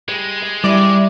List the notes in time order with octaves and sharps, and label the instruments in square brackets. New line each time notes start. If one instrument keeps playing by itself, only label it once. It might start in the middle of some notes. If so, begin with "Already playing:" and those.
[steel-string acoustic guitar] G3 [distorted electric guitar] G#3
[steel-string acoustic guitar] G4
[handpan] G3 [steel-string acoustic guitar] E4 [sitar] D5